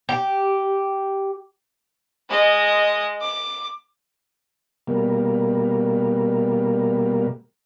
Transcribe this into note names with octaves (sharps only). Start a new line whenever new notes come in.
G4
G#3 D#5
D6
B2 G3 A#3